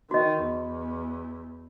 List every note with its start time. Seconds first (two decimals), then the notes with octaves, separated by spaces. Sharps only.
0.11 D#3 F#4 D#5
0.43 E2